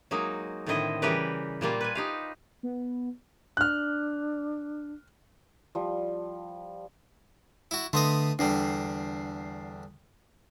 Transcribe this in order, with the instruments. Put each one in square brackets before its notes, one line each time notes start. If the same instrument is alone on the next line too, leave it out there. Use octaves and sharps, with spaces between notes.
[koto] F#3 G#3 A#3 D#4
A2 D3 D#3 C4 E4 D#5
C#3 E3 G3 G4 A#4 B4
A#2 G3 A#3 F4
B4 G#5
D#4 G4 F5
[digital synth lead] B3
[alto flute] D4 [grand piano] F6 F#6
[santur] F3 G3
[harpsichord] E4 F#4
[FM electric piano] D3 C6 [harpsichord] A3 B3 D#5
[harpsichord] E2 D3 G3 [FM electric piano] D4 C7